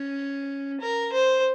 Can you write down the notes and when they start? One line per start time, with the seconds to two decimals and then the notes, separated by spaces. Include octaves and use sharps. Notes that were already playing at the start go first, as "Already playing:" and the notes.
Already playing: C#4
0.80 A#4
1.13 C5